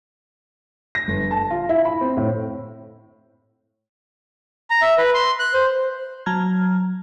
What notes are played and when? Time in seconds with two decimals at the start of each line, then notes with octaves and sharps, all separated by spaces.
0.95 A#6
1.08 G1
1.31 A5
1.51 F4
1.69 E4
1.85 B5
2.01 C4
2.17 A2
4.70 A#5
4.82 E5
4.98 B4
5.14 C6
5.39 F#6
5.54 C5
6.26 F#3 A5 A#5 F6 G#6